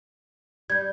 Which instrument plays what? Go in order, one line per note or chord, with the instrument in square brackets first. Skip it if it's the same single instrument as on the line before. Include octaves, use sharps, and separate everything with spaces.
[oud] G3 [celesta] G6 G#6